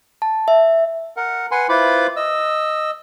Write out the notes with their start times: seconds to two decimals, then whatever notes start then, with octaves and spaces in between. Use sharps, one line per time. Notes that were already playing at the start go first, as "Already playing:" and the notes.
0.22 A5
0.48 E5
1.17 A#4 F#5
1.51 B4 F#5 G#5 C6
1.69 E4 F4 B4 C5 B5 D6
2.16 D#5 E6